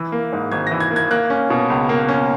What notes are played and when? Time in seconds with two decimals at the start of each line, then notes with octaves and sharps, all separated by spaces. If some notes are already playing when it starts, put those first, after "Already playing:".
Already playing: E3
0.12 A#3
0.33 G#2
0.52 G#1 G#6
0.67 E3 A#6
0.80 G#6
0.91 A#3
0.96 G#6
1.11 A#3 F#6
1.30 C#4
1.50 B2
1.70 C#2
1.89 A#3
2.09 C#4